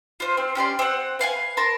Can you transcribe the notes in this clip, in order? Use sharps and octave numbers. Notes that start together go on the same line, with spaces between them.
F4 C5
C4
C#4 G4 D5 C6
C4 F#5
B4 F5 F#5 G#5
A#4 A5 B5 C6